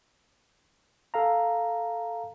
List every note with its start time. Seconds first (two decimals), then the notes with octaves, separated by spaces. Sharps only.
1.14 A4 F5 A#5